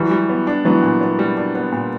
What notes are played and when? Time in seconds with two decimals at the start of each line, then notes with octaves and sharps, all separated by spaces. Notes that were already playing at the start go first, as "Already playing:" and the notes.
Already playing: E3 F#3 G3
0.11 G3
0.29 B3
0.47 D4
0.65 E3 F#3 B3
0.83 A#2
1.01 B3
1.19 G3
1.37 D4
1.55 B3
1.73 A#2